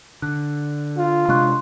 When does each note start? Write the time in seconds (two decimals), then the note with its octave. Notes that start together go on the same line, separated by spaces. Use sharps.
0.22 D3 F#6
0.98 F4
1.28 C3 G#3 D4 C6 C#6 F#6